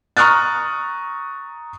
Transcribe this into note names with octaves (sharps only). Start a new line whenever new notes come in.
A#5 C#6 D#6 F6 F#6 A6